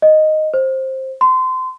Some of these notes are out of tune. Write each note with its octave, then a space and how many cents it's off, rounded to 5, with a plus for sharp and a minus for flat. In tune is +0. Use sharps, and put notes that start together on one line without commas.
D#5 -5
C5 +15
C6 -25